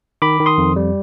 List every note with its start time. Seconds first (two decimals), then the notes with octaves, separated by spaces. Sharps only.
0.22 D#3 B5 D6
0.40 D#3
0.46 C6 D#6
0.58 F2
0.76 G3